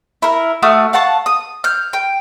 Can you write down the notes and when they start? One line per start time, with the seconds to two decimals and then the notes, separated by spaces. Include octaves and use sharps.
0.22 E4 A#4
0.63 A3 F#4 D#6 F6
0.93 F5 F#5 A5 C#6
1.26 D#6
1.64 F6 G6
1.93 G5